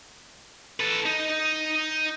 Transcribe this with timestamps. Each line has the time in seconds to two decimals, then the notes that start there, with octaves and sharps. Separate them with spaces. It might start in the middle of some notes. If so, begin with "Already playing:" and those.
0.80 A4 B4
1.06 D#4